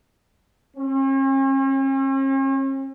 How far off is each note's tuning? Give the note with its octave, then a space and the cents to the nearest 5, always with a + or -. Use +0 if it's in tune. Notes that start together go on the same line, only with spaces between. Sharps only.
C#4 -45